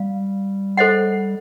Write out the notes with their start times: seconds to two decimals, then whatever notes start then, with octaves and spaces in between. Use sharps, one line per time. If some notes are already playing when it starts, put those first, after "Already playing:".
Already playing: G3 F5
0.77 A4 C5 D#5 F#5